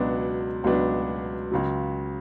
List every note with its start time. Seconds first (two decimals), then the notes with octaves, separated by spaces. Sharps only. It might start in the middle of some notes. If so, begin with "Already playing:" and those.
Already playing: C#2 B2 F#3 B3 D4
0.64 C#2 B2 F#3 B3 D4
1.51 C#2 C#3 F#3